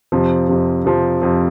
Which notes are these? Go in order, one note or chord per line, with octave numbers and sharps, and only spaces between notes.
F2 C3 F3
F2 C3 F3
F2 C3 F3
F2 C3 F3